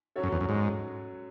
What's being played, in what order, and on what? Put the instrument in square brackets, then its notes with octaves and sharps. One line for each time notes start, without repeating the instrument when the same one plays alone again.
[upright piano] F#3 C#4 F#4 A4 C#5
[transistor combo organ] F#2
E2
F#2
G#2